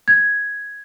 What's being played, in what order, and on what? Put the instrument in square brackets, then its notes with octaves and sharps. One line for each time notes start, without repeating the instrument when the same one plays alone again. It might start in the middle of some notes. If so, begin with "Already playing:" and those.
[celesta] G#6